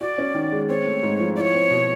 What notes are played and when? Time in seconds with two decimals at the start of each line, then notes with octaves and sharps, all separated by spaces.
0.01 F#4 D5
0.18 C#4
0.34 D#3
0.52 G#3
0.69 C4 C#5
0.86 A3
1.03 G#2
1.19 F3
1.36 E4 C#5 D5
1.54 C4
1.71 B2